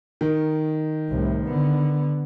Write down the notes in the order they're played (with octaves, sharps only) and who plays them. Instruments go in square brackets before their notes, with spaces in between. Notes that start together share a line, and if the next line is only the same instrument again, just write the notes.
[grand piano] D#3
[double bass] C2 A2
D3 B3